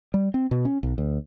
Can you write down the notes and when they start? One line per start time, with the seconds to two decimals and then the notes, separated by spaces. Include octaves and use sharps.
0.14 G3
0.34 C4
0.51 B2
0.65 C#4
0.83 B1
0.98 D2